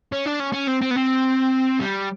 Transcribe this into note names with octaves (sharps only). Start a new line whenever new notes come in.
C#4
D4
C#4
C#4
C4
C4
B3
C4
G3